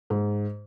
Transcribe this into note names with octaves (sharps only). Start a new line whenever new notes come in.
G#2